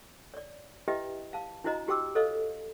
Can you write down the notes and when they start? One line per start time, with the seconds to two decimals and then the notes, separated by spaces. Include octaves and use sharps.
0.34 C#5 D5
0.88 E4 G4 B4 D#5 E5 G5
1.33 F5 A5
1.64 D4 E4 F#4 C5 D#5 A#5
1.88 F#4 G4 C5 G5 D6 E6
2.15 A4 C5 C#5 D#5 F5